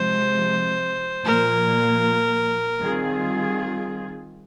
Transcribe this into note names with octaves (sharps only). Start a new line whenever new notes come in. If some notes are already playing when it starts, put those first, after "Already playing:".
Already playing: C3 F3 G#3 C5
A#2 F3 A#3 A#4
D#3 G3 C4 F4 G#4